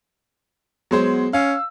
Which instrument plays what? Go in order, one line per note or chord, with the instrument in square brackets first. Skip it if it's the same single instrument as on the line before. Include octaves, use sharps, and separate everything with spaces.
[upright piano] F#3 G#3 C5 [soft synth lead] B3
[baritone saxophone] C#4 [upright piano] F5 [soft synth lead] E6